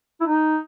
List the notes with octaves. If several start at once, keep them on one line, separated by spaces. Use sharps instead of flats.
E4
D#4